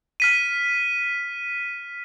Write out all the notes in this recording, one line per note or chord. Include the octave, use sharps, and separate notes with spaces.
F6 B6 D#7